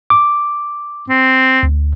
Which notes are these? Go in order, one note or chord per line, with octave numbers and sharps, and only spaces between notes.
D6
C4
D2